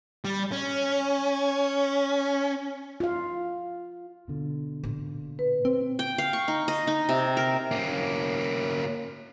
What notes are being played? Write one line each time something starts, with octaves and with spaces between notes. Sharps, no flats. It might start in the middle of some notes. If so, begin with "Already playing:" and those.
G3
C#4
F4 F5
B2 D3
A#2
B4
C4
G5
F5
C#6
D#4
D#5
D#4
C3
A#4
A#3 C#4